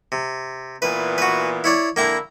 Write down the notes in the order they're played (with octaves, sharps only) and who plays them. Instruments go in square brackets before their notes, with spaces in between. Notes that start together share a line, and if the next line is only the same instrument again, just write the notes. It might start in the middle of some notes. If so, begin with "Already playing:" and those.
[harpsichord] C3
[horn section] A#2 E3 B3 [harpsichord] B4
[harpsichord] F#4 B4
E4 C#5 D5
[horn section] D3 E4 [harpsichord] A#3 G5 A#5